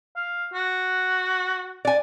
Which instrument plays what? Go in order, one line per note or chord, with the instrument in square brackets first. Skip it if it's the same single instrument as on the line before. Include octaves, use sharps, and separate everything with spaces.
[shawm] F5
F#4
[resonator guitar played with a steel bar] D5 G#5